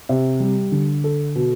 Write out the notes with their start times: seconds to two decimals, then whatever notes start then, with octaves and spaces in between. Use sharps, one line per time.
0.09 C3
0.40 G3
0.72 D3
1.04 A4
1.35 B2